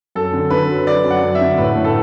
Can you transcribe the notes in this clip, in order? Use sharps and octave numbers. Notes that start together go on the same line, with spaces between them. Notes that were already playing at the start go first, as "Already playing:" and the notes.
F#2 A4
D3
D3 B4
F#3
F#3 D5
F#2
F#5
F#2
E5
D3
A2 B4
A2
A4